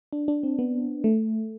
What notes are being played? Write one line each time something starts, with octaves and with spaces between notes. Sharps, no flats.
D4
D4
C4
B3
A3